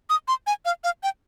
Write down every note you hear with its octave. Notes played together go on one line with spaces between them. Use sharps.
D#6
C6
G#5
F5
F5
G5